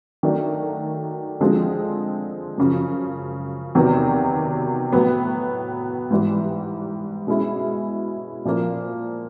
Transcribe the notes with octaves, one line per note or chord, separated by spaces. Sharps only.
D#3 F#3 A3 D4
D3 F3 G#3 C4
F#2 C#3 F3
E2 C3 D#3 F#3 B3
A2 F#3 B3
G#2 E3 G3
B2 G#3 C#4 E4
A#2 F3 A#3